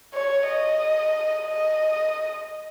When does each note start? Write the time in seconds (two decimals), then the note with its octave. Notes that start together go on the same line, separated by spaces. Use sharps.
0.14 C#5
0.47 D#5
1.47 D#5